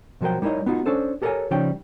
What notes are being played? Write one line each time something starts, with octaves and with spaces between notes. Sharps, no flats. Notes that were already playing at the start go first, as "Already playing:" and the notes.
B2 F3 F#3 A#4 G5
G3 D#4 E4 A#4 C#5 D#5
B3 D#4 F4 F#4
C#4 D4 A4 C5
G4 A4 A#4 C5 C#5 G#5
C#3 F3 G3 C#4 D#4 G5